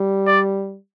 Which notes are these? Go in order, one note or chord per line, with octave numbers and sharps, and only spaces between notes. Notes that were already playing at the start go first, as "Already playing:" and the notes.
Already playing: G3
D5